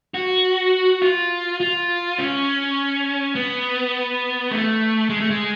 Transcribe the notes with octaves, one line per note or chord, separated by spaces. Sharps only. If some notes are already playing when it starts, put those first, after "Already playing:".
F#4
F4
F4
C#4
B3
A3
G#3
A3
G#3